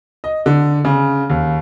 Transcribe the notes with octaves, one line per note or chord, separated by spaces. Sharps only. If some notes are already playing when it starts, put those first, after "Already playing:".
D#5
D3
C#3
D#2